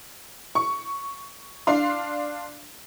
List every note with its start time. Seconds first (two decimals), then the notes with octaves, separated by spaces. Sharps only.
0.55 C#6
1.67 D4 F5 C6